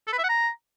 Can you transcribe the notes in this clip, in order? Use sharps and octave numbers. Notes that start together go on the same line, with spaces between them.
A4
B4
E5
F#5
A#5